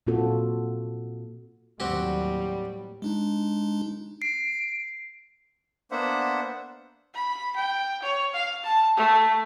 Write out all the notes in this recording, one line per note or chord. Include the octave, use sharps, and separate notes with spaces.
A#2 A#3 C4 F4 F#4 A4
D#2 A2 F#3 G3 C4 F#4 G4
G#3 D4 D#4
C7 D7
A#3 B3 D4 C5 E5 F#5
B5
G5
C#5
F5
A5
A3